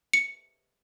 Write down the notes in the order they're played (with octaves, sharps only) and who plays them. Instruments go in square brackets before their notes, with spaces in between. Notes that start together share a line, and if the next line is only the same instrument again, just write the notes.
[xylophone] C#7